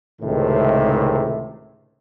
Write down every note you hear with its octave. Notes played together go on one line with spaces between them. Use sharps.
C#2 A2 C3 D#3